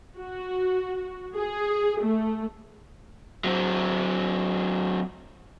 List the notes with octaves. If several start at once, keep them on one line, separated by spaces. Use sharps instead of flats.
F#4
G#4
A3
F#3 C4